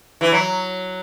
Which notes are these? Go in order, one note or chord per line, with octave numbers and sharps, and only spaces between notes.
E3
F#3